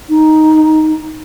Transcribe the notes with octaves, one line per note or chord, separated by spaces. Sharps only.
D#4